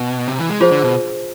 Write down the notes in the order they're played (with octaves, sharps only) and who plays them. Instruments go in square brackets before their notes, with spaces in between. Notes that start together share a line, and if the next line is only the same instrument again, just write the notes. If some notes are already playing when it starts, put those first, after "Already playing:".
Already playing: [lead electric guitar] B2
C3
E3
G#3
[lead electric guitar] F3 [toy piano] F4 G#4 C5
[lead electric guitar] D3
B2